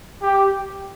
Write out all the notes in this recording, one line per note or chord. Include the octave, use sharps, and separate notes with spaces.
G4